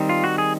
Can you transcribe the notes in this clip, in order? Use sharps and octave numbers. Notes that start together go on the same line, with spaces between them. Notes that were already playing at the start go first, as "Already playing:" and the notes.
Already playing: D#3 G3 C4 D#4
F4
F#4
G#4